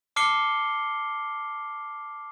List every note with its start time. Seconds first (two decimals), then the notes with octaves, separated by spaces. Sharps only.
0.16 A5 D6 F6 C7 C#7 G7